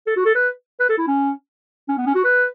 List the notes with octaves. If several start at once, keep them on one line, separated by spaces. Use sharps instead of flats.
A4
F#4
A4
B4
B4
A4
E4
C#4
C#4
B3
C#4
F#4
B4